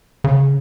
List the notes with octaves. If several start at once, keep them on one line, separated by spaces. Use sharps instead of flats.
C#3